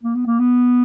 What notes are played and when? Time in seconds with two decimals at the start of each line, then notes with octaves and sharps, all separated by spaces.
0.03 A#3
0.15 B3
0.27 A#3
0.39 B3